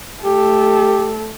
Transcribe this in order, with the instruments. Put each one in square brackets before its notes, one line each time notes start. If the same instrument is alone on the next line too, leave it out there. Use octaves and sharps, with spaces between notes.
[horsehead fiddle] A3 A4 [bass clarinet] G4